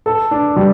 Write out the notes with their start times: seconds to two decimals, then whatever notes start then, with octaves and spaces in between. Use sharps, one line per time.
0.06 A4
0.31 D4
0.57 G3